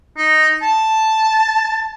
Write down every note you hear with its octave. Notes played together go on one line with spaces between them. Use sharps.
D#4
A5